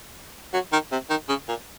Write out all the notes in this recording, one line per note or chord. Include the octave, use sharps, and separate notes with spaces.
F#3
D#3
C3
D#3
C#3
A#2